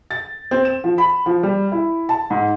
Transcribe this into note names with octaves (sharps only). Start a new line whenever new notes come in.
A6
C4
E7
F3
B5
F3
G3
E4
A5
G#2